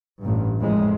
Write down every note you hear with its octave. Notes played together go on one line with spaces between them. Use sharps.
A1 G2
G#1 F2 A2 G#3